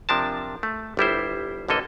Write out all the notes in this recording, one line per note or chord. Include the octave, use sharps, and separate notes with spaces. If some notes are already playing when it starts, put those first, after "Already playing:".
C3 F3 D4 A#4 A5
A3
G1 G3 E4 C5
A1 D3 A#3 A4 D#5